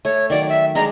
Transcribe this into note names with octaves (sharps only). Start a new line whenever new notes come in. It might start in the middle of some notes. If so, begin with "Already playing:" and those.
A3 C#5
D#3 F#3 D5
E5
G#3 D4 G#4 A#5